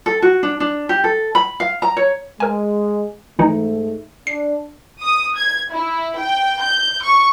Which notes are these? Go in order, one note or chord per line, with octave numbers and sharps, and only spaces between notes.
A4
F#4
D4
D4
G4
A4
B5
F5
A#5
C#5
G#3 A#4 G#5
G#2 E3 A3 D#4
D4 C7
D#6
G#6
E4
G5
G6
C#6